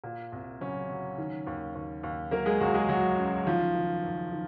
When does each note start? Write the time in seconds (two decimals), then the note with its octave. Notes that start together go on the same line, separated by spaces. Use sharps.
0.04 A#2
0.32 C2
0.61 C#3 F#3 C#4
0.89 F#3
1.18 D#3
1.47 D#2
1.75 D#2
2.03 D#2
2.31 F#3 A#3 A#4
2.46 G#3 G#4
2.61 C#2 F#3 F#4
2.74 G#3 G#4
2.89 F#3 F#4
3.18 C#3
3.46 D#3 F3 F4
3.74 D#3
4.03 F#2
4.32 D#3